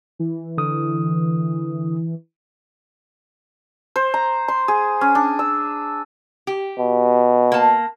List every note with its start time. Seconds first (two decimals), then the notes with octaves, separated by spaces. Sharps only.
0.19 E3
0.58 D3 D#6
3.96 C5
4.14 A#5
4.48 C6
4.68 G#4
5.01 C#4
5.15 D4
5.39 E6
6.47 G4
6.78 B2
7.52 A#3 A5